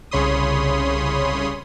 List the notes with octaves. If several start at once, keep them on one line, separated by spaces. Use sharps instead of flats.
C2 C#3 C#5 B5 C6 D#6